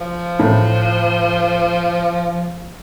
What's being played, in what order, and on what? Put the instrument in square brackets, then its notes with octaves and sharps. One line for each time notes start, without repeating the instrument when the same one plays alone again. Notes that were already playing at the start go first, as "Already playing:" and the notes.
[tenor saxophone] F3
[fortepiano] A2